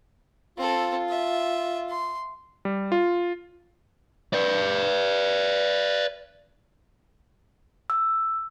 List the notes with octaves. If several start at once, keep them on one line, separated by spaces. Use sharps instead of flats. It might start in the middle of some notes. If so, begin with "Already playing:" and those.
C4 F4 A4
E5
C6
G3
F4
B4 D5
E6